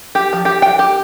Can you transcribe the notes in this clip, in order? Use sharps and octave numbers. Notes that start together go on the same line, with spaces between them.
G4
F3
G4
G5
G4